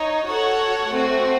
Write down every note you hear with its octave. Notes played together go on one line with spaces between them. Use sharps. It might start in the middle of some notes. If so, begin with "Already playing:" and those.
Already playing: D#4 C#5
F#4 A4 C#5 F#5
A3 C4 F#4